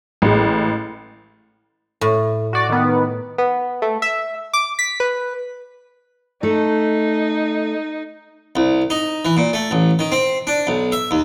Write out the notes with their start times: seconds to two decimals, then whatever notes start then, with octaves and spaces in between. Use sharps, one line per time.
0.22 A1 G#3
2.01 A2
2.53 F#4 D5
2.69 D#3 B3
3.38 B3
3.82 A3
4.02 E5
4.53 D6
4.79 B6
5.00 B4
6.43 A3 D#4 A4
8.56 C2
8.90 D#4
9.25 E3
9.37 A#2
9.53 A3
9.71 A1
9.99 D#3
10.12 C4
10.47 D4
10.67 B1
10.92 E5
11.11 D#2